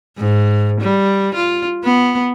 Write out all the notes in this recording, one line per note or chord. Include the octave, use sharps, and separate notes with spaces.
G#2
G3
F4
B3